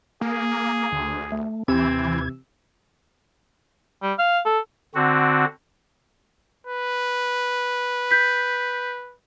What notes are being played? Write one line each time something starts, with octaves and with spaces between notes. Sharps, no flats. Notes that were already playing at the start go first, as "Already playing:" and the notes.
A#3 G#4
D2
A3
D#2 C3 E3 C4 E6 G#6
G3
F5
A4
D3 C4 F#4
B4
G6 B6